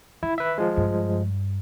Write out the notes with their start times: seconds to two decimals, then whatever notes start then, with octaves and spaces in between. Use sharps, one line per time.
0.23 D#3 E4
0.38 B4 E5
0.58 F3 G#3
0.77 G2